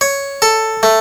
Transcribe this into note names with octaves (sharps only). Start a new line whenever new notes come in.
C#5
A4
A3